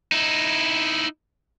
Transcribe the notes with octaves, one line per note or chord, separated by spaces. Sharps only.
D#4 E4